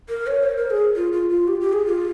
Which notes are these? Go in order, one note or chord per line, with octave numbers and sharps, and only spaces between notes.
A#4
C#5
C5
A#4
G#4
F4
F4
F4
G4
G4
G#4
F4